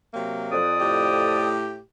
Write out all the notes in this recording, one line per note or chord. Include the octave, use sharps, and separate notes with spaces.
C3 F#3 A#3
F2 D5 D#6
A2 G4